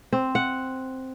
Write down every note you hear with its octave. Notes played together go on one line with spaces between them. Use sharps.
C4
F#5